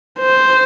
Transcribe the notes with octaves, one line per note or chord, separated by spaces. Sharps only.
C5